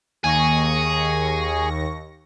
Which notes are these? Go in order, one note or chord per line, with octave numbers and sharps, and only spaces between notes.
D#2 G#4 C#6 A#6